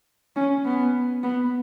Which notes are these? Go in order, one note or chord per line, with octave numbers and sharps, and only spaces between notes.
C#4
B3
B3